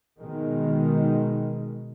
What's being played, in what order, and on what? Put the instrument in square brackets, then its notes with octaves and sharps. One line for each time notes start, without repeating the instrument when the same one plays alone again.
[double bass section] B2 D#3 G#3